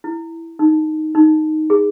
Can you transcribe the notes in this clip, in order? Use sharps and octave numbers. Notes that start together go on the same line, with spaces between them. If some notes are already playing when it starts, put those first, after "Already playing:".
E4
D#4
D#4
G#4